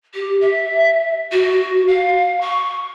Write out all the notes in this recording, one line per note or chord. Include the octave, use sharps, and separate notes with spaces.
G4
E5
F#4
F5
C#6